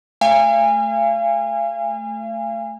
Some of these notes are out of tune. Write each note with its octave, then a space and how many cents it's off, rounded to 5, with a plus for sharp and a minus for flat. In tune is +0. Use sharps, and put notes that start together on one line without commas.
A3 +0 F5 -40 G#5 -30